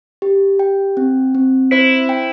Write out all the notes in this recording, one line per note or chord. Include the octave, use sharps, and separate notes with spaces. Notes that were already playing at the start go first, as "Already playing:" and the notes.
G4
G5
C4
C4
E4 C5
G5